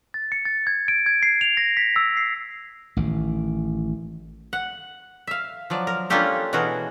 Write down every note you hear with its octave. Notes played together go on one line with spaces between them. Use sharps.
A6
C#7
A6
G#6
D7
G#6
C7
F7
A#6
B6
E6
C7
A1 D#3
F#5
E5 F5
F3 F#3 D5
A#4
A#3 C#4 D4 F4 G4 A4
B2 E3 F#4 G#4 A#4